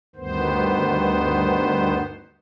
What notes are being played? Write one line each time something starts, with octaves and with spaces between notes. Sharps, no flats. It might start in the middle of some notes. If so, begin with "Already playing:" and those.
D2 G2 D#3 B3 C5